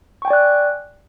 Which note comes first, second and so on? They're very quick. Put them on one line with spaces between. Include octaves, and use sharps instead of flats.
C#6 G5 G#5 D5 F#6